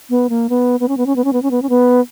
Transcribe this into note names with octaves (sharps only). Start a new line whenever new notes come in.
B3
A#3
B3
B3
C#4
B3
C#4
B3
C#4
B3
C#4
B3
C#4
B3